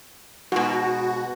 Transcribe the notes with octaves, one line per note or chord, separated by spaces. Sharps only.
G#2 B2 F#4